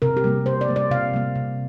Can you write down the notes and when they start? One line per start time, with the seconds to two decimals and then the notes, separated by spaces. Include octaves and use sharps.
0.02 C3 A#4
0.17 G4
0.24 G3 A#3
0.46 C3 C5
0.61 D5
0.68 G3 A#3
0.76 D5
0.91 C3 F5
1.13 G3 A#3
1.36 C3